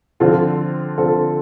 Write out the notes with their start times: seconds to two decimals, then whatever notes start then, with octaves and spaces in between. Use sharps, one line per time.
0.20 D3 F3 C4 F4 A4
0.98 D3 F3 C4 F4 A4